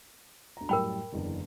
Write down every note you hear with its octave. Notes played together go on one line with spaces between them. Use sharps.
D2 A#5
F#2 A2 G3 A#4 G5 B5
F#1 E2 D3